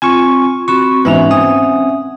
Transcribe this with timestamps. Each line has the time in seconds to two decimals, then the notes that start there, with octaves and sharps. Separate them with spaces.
0.02 C4 F4 G#5 C#6
0.68 C4 F#4 B5 C#6
1.05 G#2 E3 B3 C#4 E5 F#5
1.31 C4 G#5 D#6